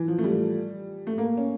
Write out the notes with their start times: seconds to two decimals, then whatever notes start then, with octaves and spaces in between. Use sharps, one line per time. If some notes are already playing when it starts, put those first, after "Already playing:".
Already playing: E3
0.08 F3
0.18 A3
0.24 G3
1.07 A3
1.18 A#3
1.37 C#4